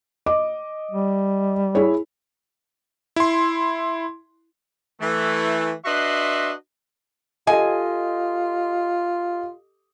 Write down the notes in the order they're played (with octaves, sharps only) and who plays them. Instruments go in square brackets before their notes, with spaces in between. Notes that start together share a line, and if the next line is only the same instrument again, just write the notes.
[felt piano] D#5 D6
[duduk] G3
[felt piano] E4 G#4 C#5
[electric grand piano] E4 C6
[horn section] E3 A3
D4 F#4 B4 D#5 E5 C6
[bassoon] F4 [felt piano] G4 A4 D#5 [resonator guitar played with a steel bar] G#5